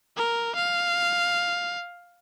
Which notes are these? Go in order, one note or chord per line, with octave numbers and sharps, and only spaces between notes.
A#4
F5